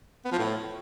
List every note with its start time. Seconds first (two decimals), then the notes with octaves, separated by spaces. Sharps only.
0.25 B3
0.32 F3
0.39 A2